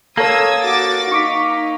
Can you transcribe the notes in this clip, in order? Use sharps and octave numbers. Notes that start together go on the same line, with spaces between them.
A#3 A4 C#5 D#6 E6 G#6
F#4 D6 A6
D#4 C#6 D6 B6